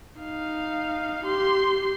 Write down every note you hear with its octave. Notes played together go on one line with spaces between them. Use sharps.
D#4 F5
G4 C6